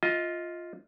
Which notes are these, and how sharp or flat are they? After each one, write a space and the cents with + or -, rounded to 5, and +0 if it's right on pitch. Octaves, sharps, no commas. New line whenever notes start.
F4 +0 D#5 +25